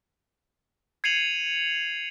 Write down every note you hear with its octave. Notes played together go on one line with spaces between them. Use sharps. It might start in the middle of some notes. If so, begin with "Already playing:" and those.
G#6 C7 C#7 D#7 F7 F#7